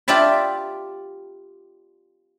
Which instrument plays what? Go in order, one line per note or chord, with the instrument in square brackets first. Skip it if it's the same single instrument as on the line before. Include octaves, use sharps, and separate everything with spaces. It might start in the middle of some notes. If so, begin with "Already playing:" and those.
[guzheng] F4 G4 D5 E5 A5 B5